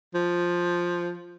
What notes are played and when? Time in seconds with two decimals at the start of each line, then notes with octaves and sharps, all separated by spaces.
0.15 F3